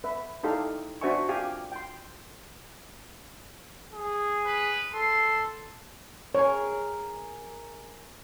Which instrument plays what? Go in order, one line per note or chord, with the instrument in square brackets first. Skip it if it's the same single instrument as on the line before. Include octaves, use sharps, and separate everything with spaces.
[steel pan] B4 E5
D#4 E4 G4 A4 F5 C6
D4 F#4 C5 E5 G#5 C#6
F4 G4 F5 G#5
G5 C6
[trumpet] G#4
[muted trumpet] B4
[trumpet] A4 [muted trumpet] C6
[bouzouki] G#4 A#4 [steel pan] C#5